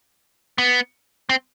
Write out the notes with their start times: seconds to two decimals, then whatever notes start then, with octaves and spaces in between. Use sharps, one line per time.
0.58 B3
1.29 C4